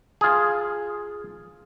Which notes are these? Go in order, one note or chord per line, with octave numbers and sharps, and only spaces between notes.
F4 G#4